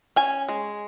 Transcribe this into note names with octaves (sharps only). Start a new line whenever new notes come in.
C#4 G#5
G#3